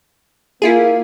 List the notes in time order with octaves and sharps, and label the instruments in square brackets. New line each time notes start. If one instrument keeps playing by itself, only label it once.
[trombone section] A#3 [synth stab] E4 F4 G#4